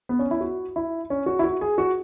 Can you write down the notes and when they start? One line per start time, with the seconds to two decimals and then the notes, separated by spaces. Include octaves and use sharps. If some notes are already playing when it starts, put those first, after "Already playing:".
0.09 B3
0.19 C#4
0.31 E4
0.41 F#4
0.76 E4
1.10 C#4
1.26 F#4
1.39 E4
1.44 F#4
1.61 G#4
1.78 F#4